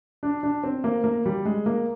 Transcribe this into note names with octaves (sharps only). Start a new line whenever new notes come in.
D4
D4
C4
A#3
A#3
G3
G#3
A#3